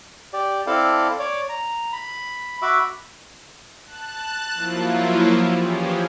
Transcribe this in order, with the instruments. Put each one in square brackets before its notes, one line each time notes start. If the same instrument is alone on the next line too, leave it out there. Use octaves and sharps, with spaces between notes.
[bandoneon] G4 D5
C4 E4 A4 D5 F5 A5
C#5 D5 D6
A#5
B5
F#4 E5 B5 D6 E6
[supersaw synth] A5 F#6
F3 F#3 A#3 E4 F4
E3 F3 C#4 G4 G#4